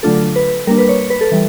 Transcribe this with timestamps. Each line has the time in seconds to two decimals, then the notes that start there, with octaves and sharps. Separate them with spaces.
0.03 D3 F#3 A3 D4 F4 A4
0.36 B4
0.67 G3 A#3 D4 A#4
0.78 B4
0.89 C#5
1.10 B4
1.21 A4
1.32 E3 G3